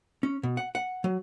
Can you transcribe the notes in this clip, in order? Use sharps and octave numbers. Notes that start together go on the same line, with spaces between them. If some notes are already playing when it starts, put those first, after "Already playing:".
C#4
B2
F#5
F#5
F#3